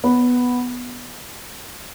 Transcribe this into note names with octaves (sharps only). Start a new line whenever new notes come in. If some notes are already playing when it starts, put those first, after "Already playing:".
B3